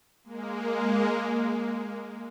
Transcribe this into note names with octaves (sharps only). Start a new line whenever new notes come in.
G#3 A#3